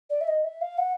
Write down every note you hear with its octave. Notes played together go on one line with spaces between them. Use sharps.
D5
E5
D#5
E5
F5
F#5